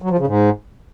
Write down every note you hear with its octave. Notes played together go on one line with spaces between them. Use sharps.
F#3
F3
C#3
G#2